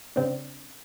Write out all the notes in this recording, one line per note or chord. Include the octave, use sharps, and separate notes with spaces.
C#3 C4 D4